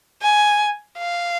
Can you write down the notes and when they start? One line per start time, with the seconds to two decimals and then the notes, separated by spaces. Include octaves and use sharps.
0.22 G#5
0.99 F5